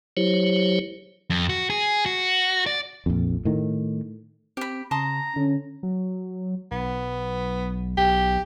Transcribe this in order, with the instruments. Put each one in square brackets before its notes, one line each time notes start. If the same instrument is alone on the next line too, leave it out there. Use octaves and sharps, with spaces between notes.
[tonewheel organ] F#3 E4 G4 C5 C#5
[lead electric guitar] F2
F#4
G#4
F#4
D5
[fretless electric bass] A#1 F2
A2 D#3
[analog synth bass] C4 [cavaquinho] G4 B5
[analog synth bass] C#3 [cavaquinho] A5 C6 D#6 [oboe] A#5
[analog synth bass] D3 [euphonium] C#4
[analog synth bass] F#3
[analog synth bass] B1 [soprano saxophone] B3
[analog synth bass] B1 [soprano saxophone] G4